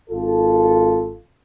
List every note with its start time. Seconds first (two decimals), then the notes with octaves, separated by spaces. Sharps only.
0.10 G#1 F4 A4